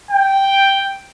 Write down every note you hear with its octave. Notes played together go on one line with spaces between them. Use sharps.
G5